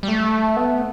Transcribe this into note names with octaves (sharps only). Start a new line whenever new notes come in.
G3
A3
B3